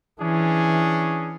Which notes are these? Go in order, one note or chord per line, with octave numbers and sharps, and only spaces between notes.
E3 C#4 D4 G#4